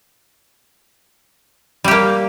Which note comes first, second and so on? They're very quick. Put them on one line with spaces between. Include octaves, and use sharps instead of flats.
G3 G4 A#3